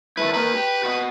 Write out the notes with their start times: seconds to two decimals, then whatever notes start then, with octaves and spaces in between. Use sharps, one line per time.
0.17 D#3 A3 E4 B4
0.34 A#3 D#4 A#4 B4
0.54 G4
0.84 F#4 D#5